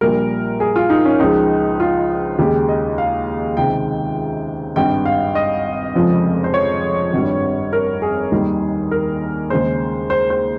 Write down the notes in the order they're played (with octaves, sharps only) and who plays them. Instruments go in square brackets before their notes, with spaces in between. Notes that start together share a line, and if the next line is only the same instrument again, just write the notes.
[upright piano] A#1 A#2 G3 A#4
G#4
F4
D#4
C#4
C#2 C#3 F3 G#3 D#4
F4
D#2 C#3 G#3 G4
D#5
F5
C#2 C3 D#3 G#3 G5
G#1 G2 G3 G5
F5
D#5
F1 F2 C#3 F3 G#3
C5
C#5
G#1 G2 G3
A#4
G#4
D#2 D#3 G3
A#4
D#2 C#3 G#3 C5
C5
C5